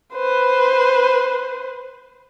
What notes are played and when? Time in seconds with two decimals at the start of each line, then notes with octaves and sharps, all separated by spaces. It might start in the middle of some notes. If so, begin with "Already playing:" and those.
0.14 B4 C5